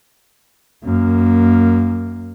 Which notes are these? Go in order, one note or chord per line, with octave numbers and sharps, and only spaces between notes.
F#2 A#3